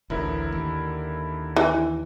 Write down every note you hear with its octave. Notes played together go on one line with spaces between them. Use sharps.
A1 D2 D3 E4 A#4
D#2
E3